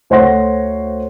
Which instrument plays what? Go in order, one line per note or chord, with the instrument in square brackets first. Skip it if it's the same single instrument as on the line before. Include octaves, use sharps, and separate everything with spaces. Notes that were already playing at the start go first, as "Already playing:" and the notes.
[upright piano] D2 C5 C#5 F#5 C6 A#6